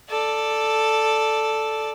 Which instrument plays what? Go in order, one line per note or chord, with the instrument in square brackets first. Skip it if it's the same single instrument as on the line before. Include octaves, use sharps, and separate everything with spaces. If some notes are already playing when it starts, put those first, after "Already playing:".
[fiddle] A4 D5